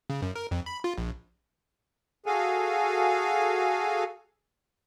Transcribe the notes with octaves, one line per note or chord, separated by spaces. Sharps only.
C#3
F#2
A#4
F2
B5
F4
A#1
F#4 G#4 A4 F5 G#5